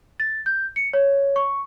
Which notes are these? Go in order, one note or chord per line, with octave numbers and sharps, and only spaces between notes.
A6
G6
C#7
C#5
C#6